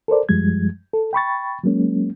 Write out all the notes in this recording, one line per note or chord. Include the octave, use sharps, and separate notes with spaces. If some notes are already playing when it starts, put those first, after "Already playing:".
A4 A#4 C5 D5
F#2 F3 G3 G#3 G#6
A4
G5 B5 C#6 A6
F#3 G#3 A#3 C#4